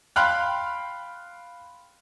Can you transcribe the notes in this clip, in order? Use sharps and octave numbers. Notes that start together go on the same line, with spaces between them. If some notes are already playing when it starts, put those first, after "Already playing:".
F5 G5 B5 C6 F6 F#6